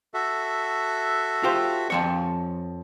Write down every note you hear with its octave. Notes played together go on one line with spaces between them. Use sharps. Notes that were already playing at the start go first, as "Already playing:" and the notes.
F#4 A4 E5
F4 G4 C5
F2 F3 C#5